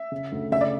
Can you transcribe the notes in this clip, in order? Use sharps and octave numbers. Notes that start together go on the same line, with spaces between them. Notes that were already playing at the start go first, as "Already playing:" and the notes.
Already playing: E5
C#3
D2
C#3 E5
D5